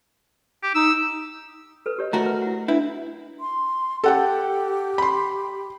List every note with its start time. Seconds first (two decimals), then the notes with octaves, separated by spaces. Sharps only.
0.63 G4
0.75 D#4 E6
1.86 A4 B4
1.98 G4 C#5 D#5
2.13 A3 F#4 A#4 A#5
2.26 B4
2.42 E4 F#5
2.68 D4 E4 B4
3.40 C6
4.04 G4 A4 F#5 G5
4.98 B5 C6